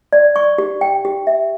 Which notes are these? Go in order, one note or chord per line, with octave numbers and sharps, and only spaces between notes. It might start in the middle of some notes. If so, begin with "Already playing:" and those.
D5
C#6
G4
G5
G4
E5